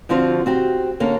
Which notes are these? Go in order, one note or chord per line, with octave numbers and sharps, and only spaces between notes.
D3 F3 C4 F4 F#4
C4 F#4 G4
D3 A#3 C#4